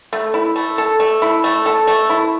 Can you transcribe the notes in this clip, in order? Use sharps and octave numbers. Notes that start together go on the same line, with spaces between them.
A3
E4
A3
A4
A3
E4
A3
A4
A3
E4